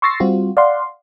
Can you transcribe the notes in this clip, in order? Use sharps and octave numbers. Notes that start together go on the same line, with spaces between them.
C6 C#6 E6 A6 A#6 C7
G3 C4 F4 F#4
D5 F5 F#5 C6